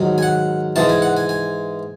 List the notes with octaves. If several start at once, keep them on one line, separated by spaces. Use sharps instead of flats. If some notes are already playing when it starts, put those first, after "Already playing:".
Already playing: G#2 D#3 F#3
G#5
F#5
G#2 E3 G#3 A5
G#5
F#5
G#5
G#5